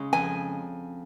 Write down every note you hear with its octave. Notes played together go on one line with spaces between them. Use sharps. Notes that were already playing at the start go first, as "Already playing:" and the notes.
Already playing: C#3 G#3
F2 G#5